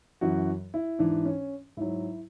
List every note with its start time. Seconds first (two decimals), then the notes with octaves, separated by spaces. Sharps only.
0.21 F#2 E3 F#4
0.74 E4
0.99 G#2 E3 D4
1.25 C#4
1.77 G#2 F#3 E4